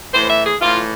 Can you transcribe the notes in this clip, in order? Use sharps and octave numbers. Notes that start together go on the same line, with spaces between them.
A2 E3 C5
E5
G#4
A2 E3 F4